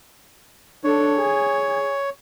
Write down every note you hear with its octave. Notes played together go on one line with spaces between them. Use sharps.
D4 A4 C#5
G#4